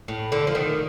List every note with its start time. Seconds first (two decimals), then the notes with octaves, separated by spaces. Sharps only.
0.08 A2
0.32 D3
0.47 F3
0.55 D#3